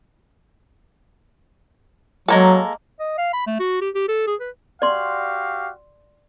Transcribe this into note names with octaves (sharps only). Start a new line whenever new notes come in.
F#3 G#3 A#3 A4
D#5
F5
B5
A3
F#4
G4
G4
A4
G#4
B4
F#4 G4 D5 F5 C6